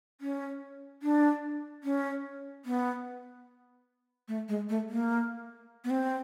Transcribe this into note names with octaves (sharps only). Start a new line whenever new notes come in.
C#4
D4
C#4
B3
A3
G#3
A3
A#3
B3
C4